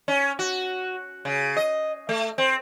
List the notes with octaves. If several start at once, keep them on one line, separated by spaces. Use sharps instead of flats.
C#4
F#4
C#3
D#5
A3
C4